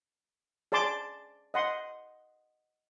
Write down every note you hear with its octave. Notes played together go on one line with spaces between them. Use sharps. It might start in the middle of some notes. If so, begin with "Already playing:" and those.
G#4 D5 A5 C6 D6
D#5 F#5 C6